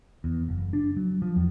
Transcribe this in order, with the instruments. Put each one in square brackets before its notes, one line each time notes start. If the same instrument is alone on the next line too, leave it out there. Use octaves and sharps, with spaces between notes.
[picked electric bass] E2
F#1
D4
F#3
F3
E2